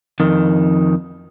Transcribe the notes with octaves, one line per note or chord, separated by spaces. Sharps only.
F2 D#3